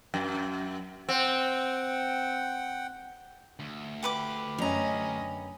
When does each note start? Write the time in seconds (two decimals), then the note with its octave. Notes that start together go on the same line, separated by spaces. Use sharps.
0.14 F#2
1.09 C4 F#5 G5
3.59 D2
4.03 G4 B4 D6
4.58 F#2 C#4 D#5 A#5